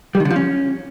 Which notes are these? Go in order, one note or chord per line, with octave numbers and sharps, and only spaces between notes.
G3
D#3
D3
F3
C#4